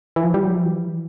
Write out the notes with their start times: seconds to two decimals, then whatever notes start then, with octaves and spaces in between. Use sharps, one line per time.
0.16 E3
0.24 F3
0.34 G3
0.45 F#3
0.54 F3
0.65 E3